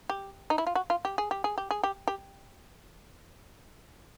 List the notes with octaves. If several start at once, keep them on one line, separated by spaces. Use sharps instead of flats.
G4
D#4
E4
F4
F#4
F4
G4
G#4
G4
G#4
G4
G#4
G4
G4